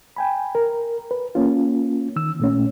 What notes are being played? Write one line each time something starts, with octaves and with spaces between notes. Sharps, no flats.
G5 G#5 B5
A#4
B4
A#3 C#4 F4
D#3 E6
A#2 A3 C#4